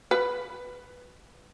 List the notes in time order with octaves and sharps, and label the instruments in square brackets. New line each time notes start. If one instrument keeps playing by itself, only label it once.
[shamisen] B4